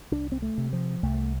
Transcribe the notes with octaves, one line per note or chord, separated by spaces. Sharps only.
C2 D4
C4
A3
C3
F3
C2 A3